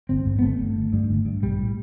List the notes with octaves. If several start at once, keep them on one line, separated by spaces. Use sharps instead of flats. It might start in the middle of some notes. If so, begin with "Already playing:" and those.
G1 C4
G2
B3
G1 A3
G2
G1
G2
G1
G2
B1 G3
A2